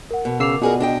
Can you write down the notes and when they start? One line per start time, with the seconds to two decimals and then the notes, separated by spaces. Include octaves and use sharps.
0.11 A#4 F#5
0.25 B2
0.40 C#3 A#4 D6 E6 C7 F7
0.61 B2 F4 F#4 G#4 A#4 D5
0.80 D4 D#5 G5